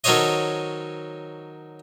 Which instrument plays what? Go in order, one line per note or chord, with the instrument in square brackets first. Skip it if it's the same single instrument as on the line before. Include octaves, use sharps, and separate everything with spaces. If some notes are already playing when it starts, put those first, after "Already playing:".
[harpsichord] D#3 F#3 A4 C5 C#5 D#5